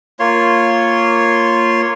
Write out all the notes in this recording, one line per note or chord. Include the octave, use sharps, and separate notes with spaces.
A#3 F4 C#5 C6